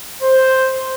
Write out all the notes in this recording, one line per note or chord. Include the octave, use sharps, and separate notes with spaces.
C5